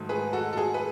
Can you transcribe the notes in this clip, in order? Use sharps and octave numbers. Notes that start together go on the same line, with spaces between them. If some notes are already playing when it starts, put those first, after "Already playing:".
Already playing: G#2 D#3 F#3 A3 D#4
G#4 B4
F#4 A4
A4
G#4
B4